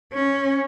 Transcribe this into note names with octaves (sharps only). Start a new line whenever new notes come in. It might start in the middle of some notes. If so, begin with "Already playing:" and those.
C#4